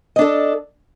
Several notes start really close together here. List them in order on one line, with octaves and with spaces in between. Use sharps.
D#5 D4 A4